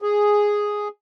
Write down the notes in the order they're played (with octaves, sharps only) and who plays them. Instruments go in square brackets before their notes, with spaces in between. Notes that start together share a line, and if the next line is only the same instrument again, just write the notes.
[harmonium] G#4